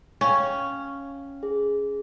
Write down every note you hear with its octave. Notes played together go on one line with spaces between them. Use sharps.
C#4 F5 G5
G#4